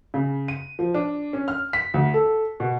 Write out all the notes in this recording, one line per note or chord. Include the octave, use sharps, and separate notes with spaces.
C#3
D#7
F3
D4
C#4
F6
B6
D2
A4
B2